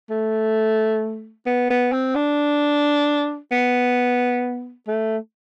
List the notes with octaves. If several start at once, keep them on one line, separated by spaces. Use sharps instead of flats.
A3
B3
B3
C4
D4
B3
A3